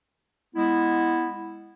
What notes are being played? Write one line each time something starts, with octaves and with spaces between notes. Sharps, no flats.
G#3 B3 E4